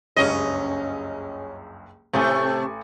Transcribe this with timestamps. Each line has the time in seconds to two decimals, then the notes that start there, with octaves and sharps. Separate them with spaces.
0.17 F#1 C#2 G2 C#4 D#5
2.14 A1 C3 A3 A4 G#5